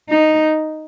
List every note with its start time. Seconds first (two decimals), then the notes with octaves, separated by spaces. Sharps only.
0.10 D#4